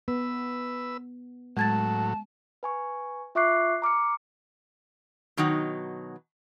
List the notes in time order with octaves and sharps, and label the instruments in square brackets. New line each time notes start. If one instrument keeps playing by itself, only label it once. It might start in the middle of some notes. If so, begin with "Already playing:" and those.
[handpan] B3 [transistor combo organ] B4 E6
[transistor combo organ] A2 F#3 [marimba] G#3 G#6 A6 [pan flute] A5
[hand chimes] B4 G#5 C#6
F4 E5 C#6 D6 F#6 C7
A#5 D6 F6 C#7
[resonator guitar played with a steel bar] B2 D#3 F#3 D#4 F#5